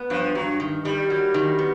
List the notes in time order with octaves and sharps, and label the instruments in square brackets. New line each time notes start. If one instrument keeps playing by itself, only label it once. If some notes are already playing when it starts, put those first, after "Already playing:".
Already playing: [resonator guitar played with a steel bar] B3
[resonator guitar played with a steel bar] G2 [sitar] F3
[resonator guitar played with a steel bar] G2 [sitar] F#3
[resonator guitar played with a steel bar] D#3
[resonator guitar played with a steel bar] D#3 [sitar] G3
[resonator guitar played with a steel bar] F#3
D#3
B3